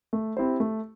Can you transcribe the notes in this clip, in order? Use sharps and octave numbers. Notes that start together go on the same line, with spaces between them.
A3
C4 E4 G4 C5
A3